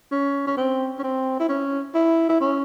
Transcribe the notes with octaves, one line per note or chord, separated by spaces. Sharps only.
C#4
C#4
C4
C#4
C4
E4
C#4
E4
E4
C#4